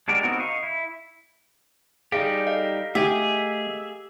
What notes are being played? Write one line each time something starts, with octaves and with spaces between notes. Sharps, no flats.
G#3 D4 F#4 G4 A#4
B3 C4 D#4 F#4 A#4
D#5 F5 C#6
E4
G3 D#4 G4 G#4 D5 F5
A4 D#5 F5
A3 G4 G#4 E5